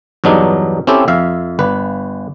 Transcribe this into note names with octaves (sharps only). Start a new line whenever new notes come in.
E2 G2 F#3 D4 D#4
C4 C#4 E4 G4 A4
F2 E5 F5
G1 B4